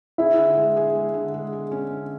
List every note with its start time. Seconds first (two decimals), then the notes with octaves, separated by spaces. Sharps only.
0.18 E4 G#4
0.37 D3
0.57 G#3
0.77 G#4
0.95 G#3
1.14 D3
1.34 G#3
1.53 G#4
1.72 C#4
1.91 D3